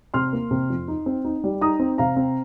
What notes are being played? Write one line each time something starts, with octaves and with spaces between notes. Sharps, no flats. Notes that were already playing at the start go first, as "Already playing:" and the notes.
C3 C6 F6
A#3
C3
F2
D#4
C4
D#4
G3
D#4 A#5 D#6
C4
C3 F5 A#5
C4